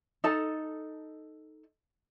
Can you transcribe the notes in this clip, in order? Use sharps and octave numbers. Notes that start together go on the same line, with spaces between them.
D#4 A4 A5